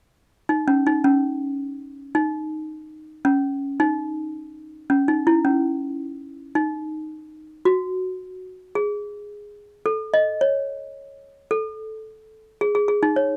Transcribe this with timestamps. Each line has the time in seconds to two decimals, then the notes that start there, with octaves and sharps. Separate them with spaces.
0.49 D#4
0.68 C#4
0.87 D#4
1.04 C#4
2.15 D#4
3.25 C#4
3.80 D#4
4.90 C#4
5.08 D#4
5.27 E4
5.45 C#4
6.55 D#4
7.65 F#4
8.75 G#4
9.86 A4
10.14 D#5
10.41 C#5
11.51 A4
12.61 G#4
12.75 G#4
12.88 G#4
13.03 D#4
13.16 C#5